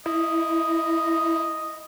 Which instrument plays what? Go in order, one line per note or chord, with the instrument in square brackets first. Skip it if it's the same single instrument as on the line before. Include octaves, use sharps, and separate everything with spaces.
[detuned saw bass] E4 [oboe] D#5